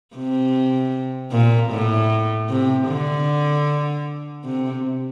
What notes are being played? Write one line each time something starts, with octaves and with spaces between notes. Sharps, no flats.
C3
A#2
A2
C3
D3
C3